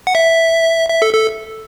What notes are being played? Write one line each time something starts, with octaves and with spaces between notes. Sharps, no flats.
F#5
E5
E5
A4
A4